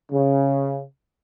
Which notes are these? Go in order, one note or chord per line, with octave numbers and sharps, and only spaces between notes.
C#3